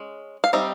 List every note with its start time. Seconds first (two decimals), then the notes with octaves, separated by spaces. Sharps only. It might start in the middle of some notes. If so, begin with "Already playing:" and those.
Already playing: G#3 C#4
0.44 F5
0.53 G3 C4 D#4 E5